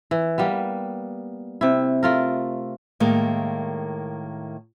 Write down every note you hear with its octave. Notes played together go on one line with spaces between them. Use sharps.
E3
G3 A#3 B3
C3 E4
A3 F4 A#4
A2 D#3 G#3 A#3 F5